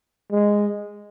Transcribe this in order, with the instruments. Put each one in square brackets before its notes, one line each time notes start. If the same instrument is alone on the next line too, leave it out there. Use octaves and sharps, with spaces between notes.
[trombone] G#3